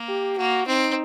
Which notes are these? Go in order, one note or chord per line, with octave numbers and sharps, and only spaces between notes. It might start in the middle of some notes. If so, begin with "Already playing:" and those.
Already playing: A#3
G4
A#3 F#4
C4 D#4